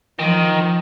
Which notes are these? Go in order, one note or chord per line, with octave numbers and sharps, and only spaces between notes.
D#3 F3